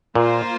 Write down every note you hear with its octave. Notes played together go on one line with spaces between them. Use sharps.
A#2 A#3 F4 C5